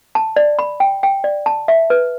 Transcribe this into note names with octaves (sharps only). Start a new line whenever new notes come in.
A5
D5
B5
G5
G5
D5
A5
E5
B4